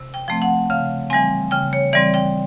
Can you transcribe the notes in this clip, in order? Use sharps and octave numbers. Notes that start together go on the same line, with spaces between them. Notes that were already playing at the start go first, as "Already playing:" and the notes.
Already playing: C3
G5
F3 A3 C4
F#5
C#3 F5
E3 G3 C4 G#5
C#3 G5
C#5
E3 G3 C4 D5
G5